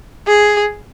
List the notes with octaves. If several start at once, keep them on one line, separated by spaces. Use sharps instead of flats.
G#4